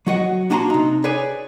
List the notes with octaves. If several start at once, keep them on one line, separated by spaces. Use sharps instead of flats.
F#3 F#4 D#5 F#5
A#3 D4 F#4 G#5 A#5 C6
C3 D#4
G#4 B4 C#5 D5 G#5